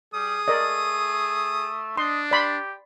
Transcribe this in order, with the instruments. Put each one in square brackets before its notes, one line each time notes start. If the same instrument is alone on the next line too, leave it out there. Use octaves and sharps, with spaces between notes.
[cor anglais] G3 [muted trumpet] G#4 [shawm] D#6
[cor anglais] A3 [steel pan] A#4 D5 D#5
[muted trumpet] D4 [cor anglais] D#5 [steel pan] C6
[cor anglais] G4 [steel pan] D5 B5 C6